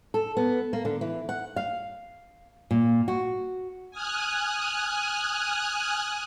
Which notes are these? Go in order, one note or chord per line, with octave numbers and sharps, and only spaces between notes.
A4
B3
A#3
D3
E3
F#5
F5
A#2
F#4
G#5 D#6 F6 F#6